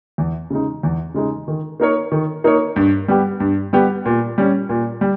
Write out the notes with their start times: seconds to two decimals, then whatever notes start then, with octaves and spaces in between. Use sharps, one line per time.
0.18 E2
0.50 C#3 G#3 D#4
0.83 E2
1.14 C#3 G#3 D#4
1.48 D#3
1.80 A#3 D#4 A#4 C#5
2.12 D#3
2.44 A#3 D#4 A#4 C#5
2.76 G2
3.08 G3 B3 G4
3.40 G2
3.73 G3 B3 G4
4.06 A#2
4.38 G3 C#4
4.69 A#2
5.01 G3